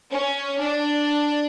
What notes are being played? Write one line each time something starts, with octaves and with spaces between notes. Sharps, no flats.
C#4
D4